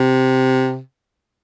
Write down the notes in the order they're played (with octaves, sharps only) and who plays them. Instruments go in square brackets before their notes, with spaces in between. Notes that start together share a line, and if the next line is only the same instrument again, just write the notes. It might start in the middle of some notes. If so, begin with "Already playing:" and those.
Already playing: [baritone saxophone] C3